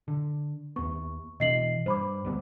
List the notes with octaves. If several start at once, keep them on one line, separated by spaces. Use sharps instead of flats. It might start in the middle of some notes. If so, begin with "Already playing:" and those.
D3
D#2 B3 C#6
B2 E3 D#5 C7 F#7
G2 C5 B5 D6
D2 G3 B3